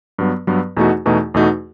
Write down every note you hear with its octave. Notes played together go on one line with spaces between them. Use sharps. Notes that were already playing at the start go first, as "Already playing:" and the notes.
G2 F#3 B3
G2 F#3 B3
E2 B2 A3 D#4 F#4
E2 B2 A3 D#4 F#4
E2 B2 A3 D#4 F#4